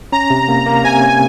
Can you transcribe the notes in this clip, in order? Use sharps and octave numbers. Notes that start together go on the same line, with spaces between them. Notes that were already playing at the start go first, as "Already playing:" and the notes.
C#4 A#5
C3
A#3
A#3
C3 G#5
C#4